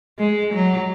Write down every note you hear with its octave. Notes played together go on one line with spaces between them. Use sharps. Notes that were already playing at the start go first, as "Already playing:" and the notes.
G#3
F#3